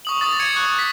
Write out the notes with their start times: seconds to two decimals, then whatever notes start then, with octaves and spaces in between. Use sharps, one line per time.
0.05 C#6 D#6 F#7
0.21 D6 D#6 A6
0.39 G#6 C#7 D#7
0.56 C#6 F#6
0.79 B6